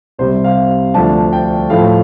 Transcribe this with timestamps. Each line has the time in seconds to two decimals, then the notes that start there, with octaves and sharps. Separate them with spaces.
0.18 C2 C3 G3 C5
0.44 F5
0.94 D2 D3 F3 D4 A5
1.33 G5
1.70 A2 F3 A3 F5